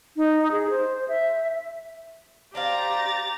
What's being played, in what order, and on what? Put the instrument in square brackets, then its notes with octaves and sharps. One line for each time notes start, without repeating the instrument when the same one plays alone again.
[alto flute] D#4
G#4
C5
E5
[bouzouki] D4 C5 F5 [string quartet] G4 A#5 A6